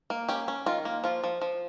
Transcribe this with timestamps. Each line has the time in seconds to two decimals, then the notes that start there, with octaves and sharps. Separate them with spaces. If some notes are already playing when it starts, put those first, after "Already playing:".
0.10 A#3
0.28 C#4 G4
0.48 C#4
0.66 D#3 F4
0.85 A#3
1.04 F3 F4
1.24 F3
1.41 F3